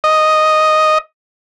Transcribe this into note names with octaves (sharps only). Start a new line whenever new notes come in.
D#5